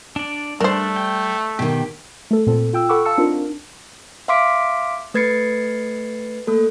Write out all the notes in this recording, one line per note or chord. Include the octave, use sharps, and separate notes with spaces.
D4 D5
G3 A3 D4 A#4 C5
G5
B2 D#3 G4
A3 A4
A#2 C4 A4
F4 G5 E6
A4 F#5 B5 C#6 D6 E6
F5 A5 E6 C#7
C4 D4 D#4 F4 A#4
E5 F5 C6 D6 B6 D7
A3 B4 G#6 A6 C7 C#7
A3 A#3 A4